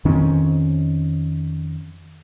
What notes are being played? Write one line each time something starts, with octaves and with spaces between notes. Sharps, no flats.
F2 D#3 C4 C#4